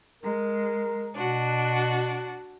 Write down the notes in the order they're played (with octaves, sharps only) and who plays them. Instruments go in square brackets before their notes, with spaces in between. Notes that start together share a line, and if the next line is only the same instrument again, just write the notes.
[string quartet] G#3 [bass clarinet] A#4
[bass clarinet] B2 [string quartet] D4 F#4